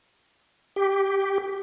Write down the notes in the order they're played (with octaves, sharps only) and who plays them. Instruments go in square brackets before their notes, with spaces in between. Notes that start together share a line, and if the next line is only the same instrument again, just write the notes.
[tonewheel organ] G4